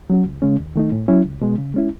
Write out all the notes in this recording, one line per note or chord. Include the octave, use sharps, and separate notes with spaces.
F#3 C#4 F#4
C#2
C#3 G#3 C#4
D#2
D#3 A3 D#4
A2
F#3 C#4 E4
C#2
B2 G#3
C#3
G#3 C#4 E4